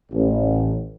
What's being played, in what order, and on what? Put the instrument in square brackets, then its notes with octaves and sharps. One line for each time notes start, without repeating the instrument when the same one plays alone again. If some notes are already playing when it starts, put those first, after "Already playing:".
[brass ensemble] A1